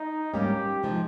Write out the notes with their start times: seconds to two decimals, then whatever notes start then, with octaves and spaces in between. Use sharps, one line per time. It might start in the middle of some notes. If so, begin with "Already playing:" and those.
Already playing: D#4
0.34 G#2 G3 A#3 C#4 G4
0.83 C3 F3 G#3 D#4